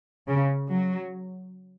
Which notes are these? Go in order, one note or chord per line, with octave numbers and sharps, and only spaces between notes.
C#3
F#3